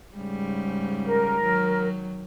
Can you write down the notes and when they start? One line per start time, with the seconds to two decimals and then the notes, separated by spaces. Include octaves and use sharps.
0.16 G#2 C#3 G3
1.05 A#4
1.42 D#3 F#3